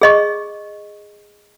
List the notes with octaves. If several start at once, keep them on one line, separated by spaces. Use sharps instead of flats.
G#4 D#5 C#6